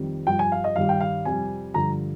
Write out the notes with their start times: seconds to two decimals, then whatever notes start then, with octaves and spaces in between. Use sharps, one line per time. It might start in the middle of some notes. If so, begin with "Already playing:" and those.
Already playing: F2 D#3 G3
0.27 G2 F3 G5
0.39 G#5
0.52 F5
0.64 D#5
0.76 G2 D#3 G3 F5
0.89 G5
1.00 F5
1.25 F2 C3 G3 G#5
1.74 G2 D3 F3 A#5